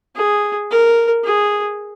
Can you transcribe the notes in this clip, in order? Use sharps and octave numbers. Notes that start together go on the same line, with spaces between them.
G#4
A#4
G#4